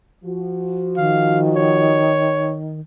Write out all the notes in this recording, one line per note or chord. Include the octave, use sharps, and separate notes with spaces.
F3 F#4
D#3 F5
C#5